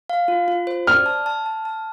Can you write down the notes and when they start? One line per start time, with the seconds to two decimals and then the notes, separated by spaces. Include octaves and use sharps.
0.10 F5
0.28 F4
0.48 F4
0.67 C5
0.87 D5 F6
1.06 A5
1.26 A5
1.46 A5
1.65 A5